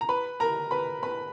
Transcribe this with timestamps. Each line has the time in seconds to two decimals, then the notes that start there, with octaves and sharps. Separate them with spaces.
0.01 A#5
0.09 B4 B5
0.40 A#4 A#5
0.71 B4 B5
1.03 B4 B5